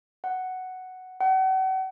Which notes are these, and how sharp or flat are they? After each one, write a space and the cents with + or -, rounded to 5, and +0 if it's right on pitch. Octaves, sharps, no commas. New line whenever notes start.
F#5 +5
F#5 +40